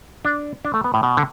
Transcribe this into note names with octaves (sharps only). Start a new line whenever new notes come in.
D4
D4
A3
B3
A2
B2
D3